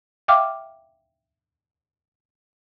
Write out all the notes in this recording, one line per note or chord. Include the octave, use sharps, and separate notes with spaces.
E5 F5 G5 D6 F6